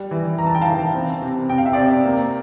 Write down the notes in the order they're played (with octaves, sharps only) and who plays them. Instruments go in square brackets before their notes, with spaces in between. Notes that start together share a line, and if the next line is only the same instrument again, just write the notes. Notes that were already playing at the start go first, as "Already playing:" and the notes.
Already playing: [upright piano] G3
E3
E3 A#5
A5
G5
F5 A5
E3
C4
C3
C3 G5
F5
E5
C3 D5 F5
A#3